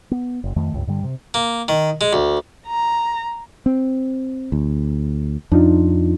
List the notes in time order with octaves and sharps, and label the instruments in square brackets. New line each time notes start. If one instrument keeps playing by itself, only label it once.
[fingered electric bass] B3
F#1
F2 D#3 A3
C#2 G2
G2 D3 G3
C3
[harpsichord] A#3
D#3
G#3
D2
[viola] A#5
[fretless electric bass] C4
D2
[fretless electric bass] F2 [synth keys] D4 D#4 F4